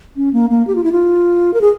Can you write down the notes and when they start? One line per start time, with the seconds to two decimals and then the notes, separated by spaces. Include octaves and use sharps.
0.16 C#4
0.33 A#3
0.50 A#3
0.67 G4
0.75 F4
0.84 E4
0.92 F4
1.54 A#4
1.61 G#4